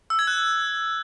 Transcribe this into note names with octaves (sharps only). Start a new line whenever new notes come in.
E6
G#6
F#6